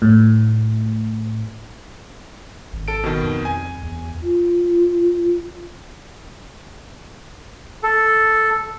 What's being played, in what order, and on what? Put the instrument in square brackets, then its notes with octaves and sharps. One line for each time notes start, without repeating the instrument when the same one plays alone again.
[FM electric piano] A2
[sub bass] G#1
[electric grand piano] A4 D7
B2 D#3
[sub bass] F2
[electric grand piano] G#5
[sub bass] E2
[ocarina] F4
[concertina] A4